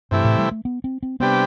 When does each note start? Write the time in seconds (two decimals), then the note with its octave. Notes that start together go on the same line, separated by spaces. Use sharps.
0.11 G2 C3 E3 A3 E4 G4
0.25 A2
0.39 G3
0.51 A3
0.65 B3
0.84 C4
1.03 C4
1.20 C3 G3 B3 D4 G4 B4